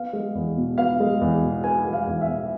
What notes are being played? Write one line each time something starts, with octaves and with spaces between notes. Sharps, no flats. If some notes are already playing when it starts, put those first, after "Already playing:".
Already playing: B3 F5
G#3
E2
B2
B3 F5
G#3
E2
B2
B3 G#5
G#3
F5
E2
E5
B2